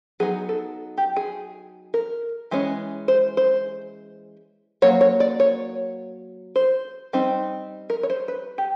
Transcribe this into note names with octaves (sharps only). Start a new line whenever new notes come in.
F#3 B3 D#4 G#4
A4
G4
G#4
A#4
E3 G#3 C#4
C5
C5
F#3 A#3 C#5
C#5
D5
C#5
C5
G3 C4 D#4
A#4
C#5
C5
B4
G4